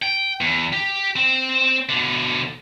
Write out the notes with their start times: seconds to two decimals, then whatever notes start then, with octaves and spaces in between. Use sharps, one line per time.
0.02 G5
0.41 E2
0.73 G4
1.16 C4
1.89 B2 D3